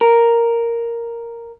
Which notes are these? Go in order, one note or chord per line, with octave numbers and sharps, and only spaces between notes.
A#4